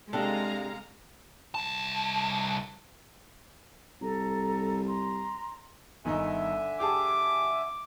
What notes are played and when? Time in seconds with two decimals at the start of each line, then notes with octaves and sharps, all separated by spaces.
0.13 C3 G#3 D4 A4 F5 A#5
1.55 C2 A5
4.01 C2 A4 A#5
4.87 A#5 C6
6.05 G1 D3 D#3 D#4 E5 G#5
6.80 G4 G#4 A5 D6